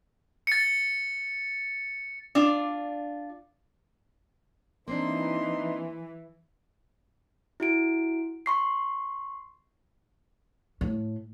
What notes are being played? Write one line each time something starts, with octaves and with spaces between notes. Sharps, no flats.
A6 C#7
D4 F4 D5
E3 A#3 C4 D4 D#4 C6
E4 F#4 D7
C6 C#6 C7
A2